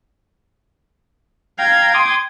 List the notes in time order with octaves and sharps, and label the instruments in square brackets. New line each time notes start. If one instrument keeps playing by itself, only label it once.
[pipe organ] F5 A#5 [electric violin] G5 G#6
[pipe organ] C6 D6 D#6